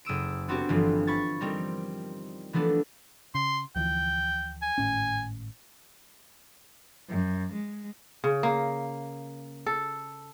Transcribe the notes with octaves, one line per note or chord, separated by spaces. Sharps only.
F#1 D#6 E6 D7
B3 C4 D4 F#4 G4
G1 E3 F3
B5 C#6 G#6 A6
G3 C4 D#4 A#4
E3 F3 A3 B3 D4
C#3 C6
D2 E3 F3 G5
G#5
G#1 A2 C#4
F#2
G#3
C#3
A#3
A4